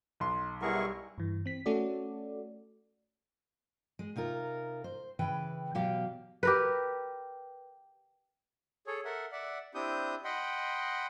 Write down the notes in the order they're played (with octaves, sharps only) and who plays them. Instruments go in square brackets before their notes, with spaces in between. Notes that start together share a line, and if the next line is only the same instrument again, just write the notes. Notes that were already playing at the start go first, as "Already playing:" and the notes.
[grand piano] B1 C6
[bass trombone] G3 [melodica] B3 G#4 A#4 [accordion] E4 C#6
[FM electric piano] G2 E3
C4 B6
A3 C#4 F#4 A4 D5
[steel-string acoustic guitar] G#3
C3 D#4 F4 A#4
C5
C#3 E3 B4 G5
B2 F#3 G4 F5
[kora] G4 A#4 B4
[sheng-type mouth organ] G#4 A4 C#5
A4 A#4 E5 F#5
D5 E5 F#5
C4 D4 E4 G4 D#6 G6
D#5 F#5 G5 B5 C6